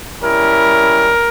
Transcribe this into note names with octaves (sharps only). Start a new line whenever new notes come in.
G3 C#4 E4 A#4